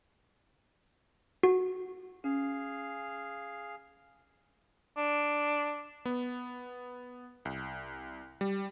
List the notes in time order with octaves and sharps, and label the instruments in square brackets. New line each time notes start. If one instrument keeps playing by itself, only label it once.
[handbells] F#4
[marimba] C#4 [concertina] G#4 F5
[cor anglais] D4
[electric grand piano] B3
C2
G3